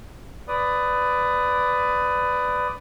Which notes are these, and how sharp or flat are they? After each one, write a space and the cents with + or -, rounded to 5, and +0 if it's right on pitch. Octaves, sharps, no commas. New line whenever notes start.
B4 +15 D5 +0 D#6 +0